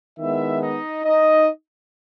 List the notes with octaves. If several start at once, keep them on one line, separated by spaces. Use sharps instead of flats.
D#3 G#3 B3 E4 E5
D#4 D#5
D#4 D#5